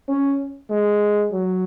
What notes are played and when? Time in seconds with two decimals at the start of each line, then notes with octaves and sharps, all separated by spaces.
0.08 C#4
0.70 G#3
1.32 F#3